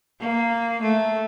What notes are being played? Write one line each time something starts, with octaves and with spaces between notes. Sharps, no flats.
A#3
A3